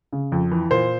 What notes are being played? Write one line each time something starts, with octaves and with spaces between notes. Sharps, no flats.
C#3
F2
E3
A#2 C5